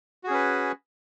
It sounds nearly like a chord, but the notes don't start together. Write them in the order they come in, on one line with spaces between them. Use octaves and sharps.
F#4 G#4 C#4 B4